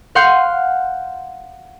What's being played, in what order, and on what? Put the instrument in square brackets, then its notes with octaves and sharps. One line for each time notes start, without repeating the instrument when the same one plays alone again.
[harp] F5 F#5 C6 F6 G6